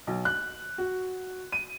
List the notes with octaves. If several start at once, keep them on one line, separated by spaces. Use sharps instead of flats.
B1
F#6
F#4
D#7